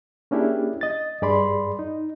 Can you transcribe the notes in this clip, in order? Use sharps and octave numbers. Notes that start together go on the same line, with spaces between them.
A#3 C#4 D4 E4 G4 G#4
D#5 A6
G2 G#4 D5 B5 C6
D#4